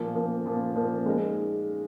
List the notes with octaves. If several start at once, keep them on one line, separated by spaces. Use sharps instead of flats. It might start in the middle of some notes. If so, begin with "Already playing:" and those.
Already playing: A#2 F3 A#3
A#2 F3 A#3
A#2 F3 A#3
A#2 F3 A#3
G#3 D#4 A#4